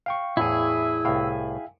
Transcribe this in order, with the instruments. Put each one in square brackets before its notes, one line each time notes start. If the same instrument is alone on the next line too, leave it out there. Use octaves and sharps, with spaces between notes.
[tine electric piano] F5 G5 C#6
[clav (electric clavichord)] E2 A2 [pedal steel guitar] E4 G#4 [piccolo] E6
[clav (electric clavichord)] C2 A2 [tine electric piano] F5 G5